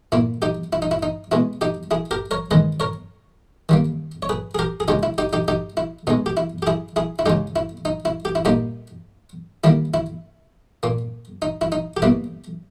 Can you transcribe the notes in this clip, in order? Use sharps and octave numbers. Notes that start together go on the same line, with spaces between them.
A#2 A#3 E4
D#4 G4
E4
D#4
E4
D#4
B2 G#3 E4
D#4 G4
E4 G#4
G4 A#4
A#4 C#5
D#3 G#3 B4 D#5
A#4 C#5
D#3 G3 A#3
C#5
G#4 B4
G#4
G4 A#4
G#4
C#3 G#3 D#4 G4
E4
D#4 G4
D#4 G4
D#4 G4
E4
B2 G#3 D#4
G4
E4
G4
E4 G#4
E4 G#4
E4
C#3 G#3 D#4 G4
E4
D#4
E4
G4
E4
A#2 G3 A#3 D#4 G4
D#3 G3 A#3 E4
E4
A#2 A#3
D#4
E4
D#4
G4
B2 G3 A#3 E4